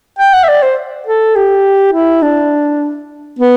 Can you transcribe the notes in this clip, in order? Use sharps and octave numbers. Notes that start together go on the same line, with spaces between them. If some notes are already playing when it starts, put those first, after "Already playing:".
G5
F#5
E5
D5
C5
A4
G4
E4
D4
B3